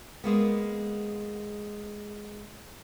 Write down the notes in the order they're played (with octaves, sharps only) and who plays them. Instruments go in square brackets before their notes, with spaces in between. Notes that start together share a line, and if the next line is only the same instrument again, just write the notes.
[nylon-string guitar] G#3 A#3 B3